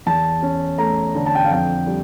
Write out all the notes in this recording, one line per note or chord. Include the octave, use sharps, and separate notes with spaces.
E2 A5
C#4
A3 A#5
D3
A5
G5
F5
F2 G5
G3